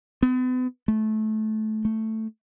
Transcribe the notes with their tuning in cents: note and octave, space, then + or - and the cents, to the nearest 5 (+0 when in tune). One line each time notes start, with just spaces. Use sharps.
B3 +40
A3 -20
A3 +5